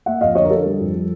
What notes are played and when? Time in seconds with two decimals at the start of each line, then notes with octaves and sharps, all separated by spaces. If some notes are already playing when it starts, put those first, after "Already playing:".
0.06 A#3 E5 F#5
0.21 F2 D#5 F5
0.35 D3 C#5 D#5
0.45 A#4
0.50 D3 A4
0.66 G3
0.80 F2
0.94 G3